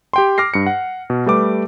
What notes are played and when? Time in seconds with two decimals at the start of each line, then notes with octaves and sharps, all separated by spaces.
0.13 G4 G5 C6
0.38 D6 F6 A#6 C7
0.54 G2 C#7
0.66 F#5
1.10 B2
1.26 G3 A3 B4 D6